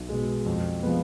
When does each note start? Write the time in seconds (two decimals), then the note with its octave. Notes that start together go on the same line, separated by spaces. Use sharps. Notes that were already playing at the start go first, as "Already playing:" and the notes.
Already playing: B1
0.09 B2 G#3
0.46 F2
0.83 F3 G#3 B3